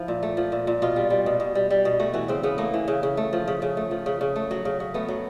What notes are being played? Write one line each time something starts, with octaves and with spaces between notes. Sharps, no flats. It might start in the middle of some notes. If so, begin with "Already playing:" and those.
Already playing: F3 E4
A#2
A3
F3
A#2
A#2
B2 F4
G3
G3
B2
B2
G3
G3
B2
A3 F#4
E3 F#4
C#3 C4
C#3 B3
A3 A#3
E3
C#3
C#3
A3
F3
C#3
C#3
A3
F3
C#3
C#3
A3
F#3
C#3
C#3
A3 B3
F#3